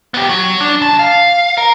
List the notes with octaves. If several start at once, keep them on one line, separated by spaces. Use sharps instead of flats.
B3 G4
F#3
D4
C2 A5
F5
A#4